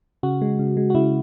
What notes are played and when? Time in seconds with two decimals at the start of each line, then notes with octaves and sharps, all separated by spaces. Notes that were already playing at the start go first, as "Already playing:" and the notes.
0.23 C#3 F#4
0.41 G#3
0.59 C#3
0.77 G#3
0.90 F#4
0.95 C#3 E4